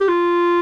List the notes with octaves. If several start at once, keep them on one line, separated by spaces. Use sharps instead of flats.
G4
F4